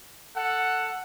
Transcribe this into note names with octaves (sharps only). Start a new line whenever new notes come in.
A4 F#5